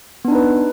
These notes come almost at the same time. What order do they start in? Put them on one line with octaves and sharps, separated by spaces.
B3 D4 D#4 B4